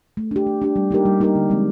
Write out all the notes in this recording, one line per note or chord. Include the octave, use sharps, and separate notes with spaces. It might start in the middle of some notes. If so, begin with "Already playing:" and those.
A3
D4 G4
A3
D4 G4
G3
A#3 D#4 G4 A#4
G3
A#3 D#4 G4 A#4
D3
F3 G#3 C4